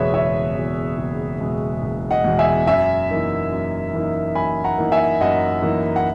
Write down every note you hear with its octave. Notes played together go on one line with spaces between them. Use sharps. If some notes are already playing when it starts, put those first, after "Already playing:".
Already playing: F#1 E2 B2 G#3 G#4 B4 C#5 E5
F#1 C#5 E5
E2 B2 G#3
F#1
E2 B2 G#3
F#1
D#5 F#5
E2 B2 G#3
E5 G#5
F#2 E5 G#5
E3 A#3 D#4
F#2
E3 A#3 D#4
F#2 G#5 B5
F#5 A#5
E3 A#3 D#4
E5 G#5
F#2 D#5 F#5
E3 A#3 D#4
F#5